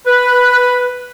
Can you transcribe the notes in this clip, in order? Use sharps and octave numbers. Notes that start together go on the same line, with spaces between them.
B4